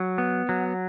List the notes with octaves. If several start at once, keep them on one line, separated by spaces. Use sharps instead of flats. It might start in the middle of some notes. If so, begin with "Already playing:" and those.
Already playing: F#3
B3
F#3